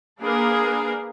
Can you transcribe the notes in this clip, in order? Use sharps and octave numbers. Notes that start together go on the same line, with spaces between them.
A#3 D4 G#4 A#4 B4 F5